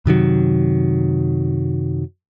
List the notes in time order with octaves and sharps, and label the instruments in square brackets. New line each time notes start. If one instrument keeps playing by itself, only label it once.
[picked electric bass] F#2 C3 D#3 F#3